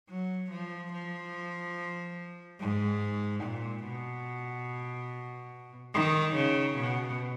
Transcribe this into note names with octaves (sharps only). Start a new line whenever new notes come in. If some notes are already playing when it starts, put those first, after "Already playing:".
F#3
F3
F3
G#2
A#2
B2
D#3
C#3
B2